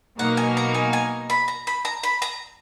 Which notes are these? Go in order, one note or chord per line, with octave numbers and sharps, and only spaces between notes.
B2 F#3 A#3 D#4 A#4 F#5
G#5
A#5
G#5
G#5
B5
A#5
B5
A#5
B5
A#5